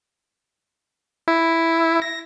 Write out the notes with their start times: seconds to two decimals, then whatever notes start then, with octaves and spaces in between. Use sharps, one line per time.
1.28 E4
2.02 A#6